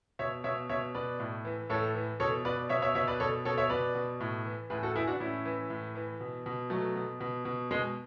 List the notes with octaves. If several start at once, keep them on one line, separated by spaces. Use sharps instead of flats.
B2 C#5 E5
B2 C#5 E5
B2 C#5 E5
B2 B4 D5
A2
E3
A2 A4 C#5
E3
B2 A4 C#5
B2 B4 D5
B2 C#5 E5
C#5 E5
B2 C#5 E5
B4 D5
B2 A4 C#5
B2 A4 C#5
C#5 E5
B2 B4 D5
B2
A2
E3
A2 G#4 B4
F#4 A4
E3 E4 G#4
D4 F#4
A2 C#4 E4
E3
A2
E3
B2
B2
B2 F#3 A3
B2
B2
B2
B2 G#3